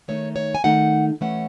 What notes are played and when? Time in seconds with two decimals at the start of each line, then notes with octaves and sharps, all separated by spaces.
0.08 D#3 A3 D#4 C#5
0.36 C#5
0.55 G#5
0.64 D#3 A3 D#4 F#5
1.21 E3 A3 C#4 F#5